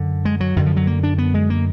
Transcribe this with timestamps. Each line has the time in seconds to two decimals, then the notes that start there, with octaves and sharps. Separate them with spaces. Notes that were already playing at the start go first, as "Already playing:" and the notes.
Already playing: F#2 D3
0.25 G#3
0.40 F#3
0.56 F#2 D3 D#3
0.66 F3
0.77 F#3
0.87 A#3
1.03 D4
1.18 B3
1.34 G#3
1.50 A#3